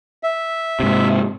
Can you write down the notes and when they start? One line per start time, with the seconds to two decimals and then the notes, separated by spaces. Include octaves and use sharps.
0.23 E5
0.80 G#2 C3